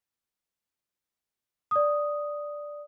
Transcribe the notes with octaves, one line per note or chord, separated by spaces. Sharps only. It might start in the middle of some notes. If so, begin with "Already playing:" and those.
D5 D#6